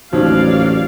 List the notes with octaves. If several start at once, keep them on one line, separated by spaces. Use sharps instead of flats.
A1 D#2 F3 F#3 D5 F5